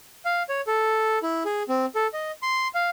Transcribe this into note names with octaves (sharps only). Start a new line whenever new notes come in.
F5
C#5
A4
E4
G#4
C4
A4
D#5
C6
F5